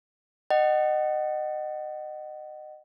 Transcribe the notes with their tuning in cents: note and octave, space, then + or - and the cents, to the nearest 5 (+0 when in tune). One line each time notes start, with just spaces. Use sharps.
D#5 -25 F#5 +30